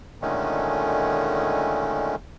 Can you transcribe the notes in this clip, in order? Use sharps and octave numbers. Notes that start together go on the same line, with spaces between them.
A#2 D3 D#3 G#3 A3 C#4